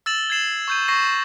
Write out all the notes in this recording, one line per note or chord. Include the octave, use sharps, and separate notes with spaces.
E6 A6 E7 F#7
G#6 A6 C7 E7 F#7
C#6 G6 D#7
C#6 A#6 C7 D#7